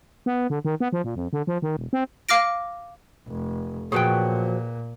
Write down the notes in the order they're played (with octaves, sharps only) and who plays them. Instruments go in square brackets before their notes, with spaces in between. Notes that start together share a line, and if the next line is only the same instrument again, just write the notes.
[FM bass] B3
D3
D#3
B3
F3
A#2
F2
D3
F3
D#3
E1
C4
[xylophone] F5 D6 F6 A#6 D7
[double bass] F1
[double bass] A#2 [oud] F3 F#3 C#5 [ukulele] G#4 B4 G5